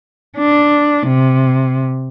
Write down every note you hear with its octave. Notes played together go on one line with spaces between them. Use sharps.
D4
C3